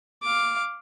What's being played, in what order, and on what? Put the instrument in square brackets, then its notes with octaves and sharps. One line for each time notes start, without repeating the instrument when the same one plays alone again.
[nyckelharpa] F5 D6